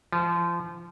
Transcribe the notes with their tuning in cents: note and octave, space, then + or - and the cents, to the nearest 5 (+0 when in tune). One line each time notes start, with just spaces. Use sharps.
F3 -25